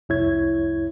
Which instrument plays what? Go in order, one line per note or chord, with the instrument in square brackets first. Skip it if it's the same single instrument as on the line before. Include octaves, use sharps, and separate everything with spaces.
[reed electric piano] C2 F2 E4 C#5 G#6